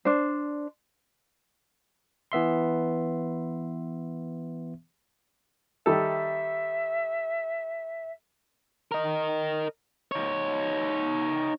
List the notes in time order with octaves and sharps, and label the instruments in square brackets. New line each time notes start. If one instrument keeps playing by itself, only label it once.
[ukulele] D4 C5
[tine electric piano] E3 B3 E5 C6
[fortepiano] D#3 G3 A4 [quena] E5
[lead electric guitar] A#4 D#5
D#4 C#5